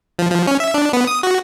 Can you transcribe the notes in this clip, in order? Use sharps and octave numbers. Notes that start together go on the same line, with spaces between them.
F3
F3
C#4
E5
D4
B3
D#6
F#4